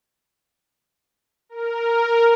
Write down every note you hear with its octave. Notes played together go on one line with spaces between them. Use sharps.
A#4